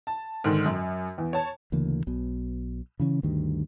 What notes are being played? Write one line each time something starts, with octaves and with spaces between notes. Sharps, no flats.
A5
G#2 D3 D#3
F#2
E2
C#5 A5
D2 C#3 E3 A#3
B1 B2
C#3 E3 C#4
D2 G2 D#3